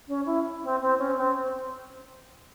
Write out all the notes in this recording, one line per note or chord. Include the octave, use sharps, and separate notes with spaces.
C#4
E4
C4
C4
C#4
C4